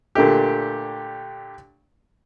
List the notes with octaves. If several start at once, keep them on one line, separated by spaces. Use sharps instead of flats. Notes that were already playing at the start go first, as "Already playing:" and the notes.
A#2 D3 A3 G4